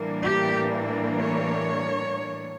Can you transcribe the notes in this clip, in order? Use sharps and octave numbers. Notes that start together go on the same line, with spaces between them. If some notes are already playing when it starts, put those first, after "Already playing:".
Already playing: A2 E3 G3 A#3 D4
G4
C#5